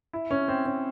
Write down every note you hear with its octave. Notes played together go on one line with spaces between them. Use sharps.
E4
C#4
C4
C#4